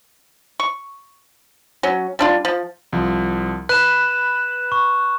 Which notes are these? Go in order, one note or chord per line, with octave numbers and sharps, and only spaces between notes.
C#6
F#3 C#4
G3 D4 F4
F3
C2 F3
B4 B5 F#6 E7
C#6